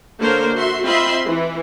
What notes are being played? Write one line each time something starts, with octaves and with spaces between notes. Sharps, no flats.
D3 A#3 A4 A#4 C5 C#5
F#4 E5 C6
C4 F4 D#5 E5 B5 C6
E3